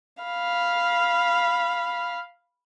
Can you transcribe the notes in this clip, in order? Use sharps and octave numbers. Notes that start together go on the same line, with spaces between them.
F5 B5